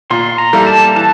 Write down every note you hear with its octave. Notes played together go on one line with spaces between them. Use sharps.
A#2 C6
A#5
G3 A#3 E4 A4
A5
E3 A5